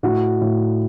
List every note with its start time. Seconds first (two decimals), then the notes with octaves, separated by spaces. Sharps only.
0.03 A2 F#4
0.41 A2